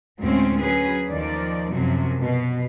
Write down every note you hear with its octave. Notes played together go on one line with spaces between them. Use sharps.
D2 A2 G#3 C4 C#4
F#3 C#4 G#4 B4
D#2 D#3 F3 D5
F#2 C3 F3 F#3
B2